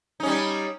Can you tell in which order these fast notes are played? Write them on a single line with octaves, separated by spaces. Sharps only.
D#4 C#4 G3